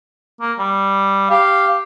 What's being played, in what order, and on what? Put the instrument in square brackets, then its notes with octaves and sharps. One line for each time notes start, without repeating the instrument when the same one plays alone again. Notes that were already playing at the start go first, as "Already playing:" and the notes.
[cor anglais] A#3
G3
[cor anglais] G4 [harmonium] F5